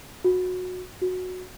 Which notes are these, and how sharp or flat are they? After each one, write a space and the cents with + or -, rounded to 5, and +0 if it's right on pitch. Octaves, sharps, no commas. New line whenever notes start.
F#4 -20
F#4 -10